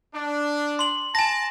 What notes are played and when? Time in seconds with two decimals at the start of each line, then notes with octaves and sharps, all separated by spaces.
0.14 D4
0.79 C6 F#7
1.15 G#5 A5 A#6